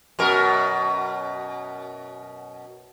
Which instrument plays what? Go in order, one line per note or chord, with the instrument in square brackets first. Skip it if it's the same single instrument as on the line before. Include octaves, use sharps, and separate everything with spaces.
[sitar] F#2 B2 A#4